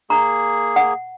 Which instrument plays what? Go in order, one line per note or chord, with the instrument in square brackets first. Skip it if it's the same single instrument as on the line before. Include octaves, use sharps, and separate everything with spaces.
[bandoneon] A#3 G#4 [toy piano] A#5
[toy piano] F#5